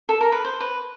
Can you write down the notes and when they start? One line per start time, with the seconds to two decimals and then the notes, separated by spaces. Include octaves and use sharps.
0.09 A4
0.21 A#4
0.32 B4
0.45 C5
0.60 B4